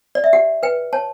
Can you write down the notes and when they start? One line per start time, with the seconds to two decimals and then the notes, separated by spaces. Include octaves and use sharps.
0.15 D5
0.24 E5
0.33 G4 F#5
0.63 B4 G5
0.93 C#5 A5